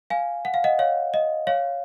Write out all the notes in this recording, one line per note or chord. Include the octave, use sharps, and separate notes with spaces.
F5 G#5
F#5
F5
D#5 F#5
C#5 F5
D#5
C#5 F5